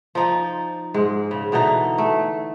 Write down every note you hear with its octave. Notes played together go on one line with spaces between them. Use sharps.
F3 D#4 D5
G#2 G#3
C#3
B2 D3 E3 D#4
A3